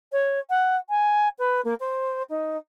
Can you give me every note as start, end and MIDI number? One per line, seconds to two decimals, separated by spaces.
0.12 0.39 73
0.49 0.76 78
0.89 1.28 80
1.38 1.61 71
1.64 1.74 58
1.80 2.22 72
2.29 2.56 63